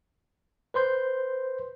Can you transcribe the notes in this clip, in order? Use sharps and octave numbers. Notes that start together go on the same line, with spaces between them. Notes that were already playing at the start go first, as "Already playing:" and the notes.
B4 C5 C6 G6